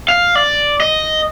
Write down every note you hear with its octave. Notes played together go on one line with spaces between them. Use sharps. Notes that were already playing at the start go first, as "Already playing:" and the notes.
F5
D5
D#5